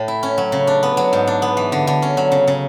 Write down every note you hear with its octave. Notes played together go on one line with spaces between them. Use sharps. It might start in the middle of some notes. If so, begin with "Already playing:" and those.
Already playing: A2
E4
C#4
F#3
C#3
D4
B3
F#3
G#2
D4
B3
E3
D3
D3
C#4
F#3
C#3
C#3